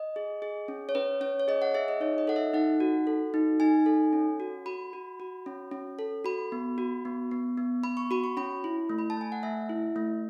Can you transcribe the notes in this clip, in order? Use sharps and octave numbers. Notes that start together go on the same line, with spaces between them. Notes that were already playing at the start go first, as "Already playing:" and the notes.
Already playing: D#5
G#4
G#4
C#4
C#5
C#4 B4
C#4 C#5
C#5
G#4 D#5
F#5
G#4 E5
D#5
D#4 C#5
D#5
A4 F#5
E5
D#4 F#5
F#4
A4
D#4
D#4 G#5
A4
C#4
F#4
F#4 B5
F#4
F#4
C#4
C#4
A4
F#4 B5
B3
F#4
B3
B3
B3
B3 B5
C#6
F#4 B5
C#6
C#4 B5
E4
A3
B5
A5
A3 G#5
F#5
A3 E5
E4
A3